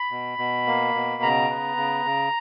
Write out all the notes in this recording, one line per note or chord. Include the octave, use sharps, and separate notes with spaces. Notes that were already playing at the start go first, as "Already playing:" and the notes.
Already playing: B5
B2
B2
A#3
B2
C#3 A#5
B3
C#3
C#3